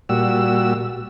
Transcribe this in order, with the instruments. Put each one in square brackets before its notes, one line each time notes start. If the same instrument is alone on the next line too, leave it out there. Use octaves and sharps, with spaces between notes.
[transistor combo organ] A#2 G3 F#4 E6